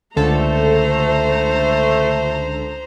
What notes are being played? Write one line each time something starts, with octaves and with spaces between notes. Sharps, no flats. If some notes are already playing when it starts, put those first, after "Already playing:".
C#2 D3 A3 A4 C5 A#5